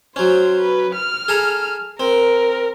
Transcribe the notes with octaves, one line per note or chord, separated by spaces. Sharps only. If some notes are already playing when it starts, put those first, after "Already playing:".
F#3 C#4 C5
B4
F6
G#4 A4 A#5
C4 A#4